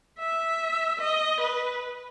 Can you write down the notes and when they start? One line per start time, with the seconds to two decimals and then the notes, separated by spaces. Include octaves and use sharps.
0.19 E5
1.00 D#5
1.41 B4